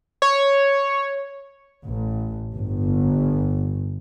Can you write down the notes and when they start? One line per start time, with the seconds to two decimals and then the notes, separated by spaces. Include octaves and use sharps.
0.22 C#5
1.84 A1
2.54 G1